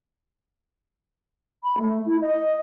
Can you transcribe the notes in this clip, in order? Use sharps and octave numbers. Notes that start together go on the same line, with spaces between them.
B5
A3
E4
D#5